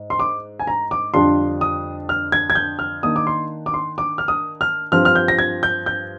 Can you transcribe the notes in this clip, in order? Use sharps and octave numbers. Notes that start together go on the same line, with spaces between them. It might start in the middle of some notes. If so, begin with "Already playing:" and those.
Already playing: G#2
C6
D6
G#5
A#5
D6
F2 D3 G3 D4 F4 C6
D#6
F6
G#6
G#6
G6
F6
D#3 A#3 D4 D#6
D6
C6
D6
C6
D6
F6
D#6
F6
G2 F3 C4 F4 F6
F6
G6
A#6
G#6
G6
G6